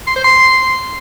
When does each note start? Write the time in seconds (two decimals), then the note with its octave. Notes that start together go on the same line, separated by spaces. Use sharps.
0.07 C6
0.15 C5
0.24 C6